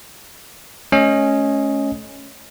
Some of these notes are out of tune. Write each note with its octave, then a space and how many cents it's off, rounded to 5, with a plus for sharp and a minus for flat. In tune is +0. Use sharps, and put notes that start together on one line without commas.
A3 -40 C#4 +0 D#5 +10